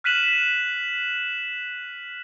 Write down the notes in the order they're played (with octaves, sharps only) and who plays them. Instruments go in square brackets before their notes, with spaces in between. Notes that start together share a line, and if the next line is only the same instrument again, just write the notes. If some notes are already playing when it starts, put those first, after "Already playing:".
[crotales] F6 F#6 B6 D#7 E7 F#7